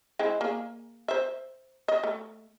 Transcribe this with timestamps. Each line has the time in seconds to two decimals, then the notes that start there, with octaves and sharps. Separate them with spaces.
0.19 G#3 C4 E4
0.41 A#3 G#4
1.08 C5 E5
1.88 D#5
2.04 A3